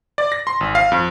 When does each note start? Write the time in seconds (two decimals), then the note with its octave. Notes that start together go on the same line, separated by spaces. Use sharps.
0.18 D5
0.32 A#6
0.47 C6
0.61 G#1
0.75 F5
0.92 F2